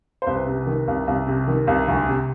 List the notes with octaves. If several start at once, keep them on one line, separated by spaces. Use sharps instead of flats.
C5
C2 B4
C3
D#3
C2
C2
C3
D#3
C2
D2
C3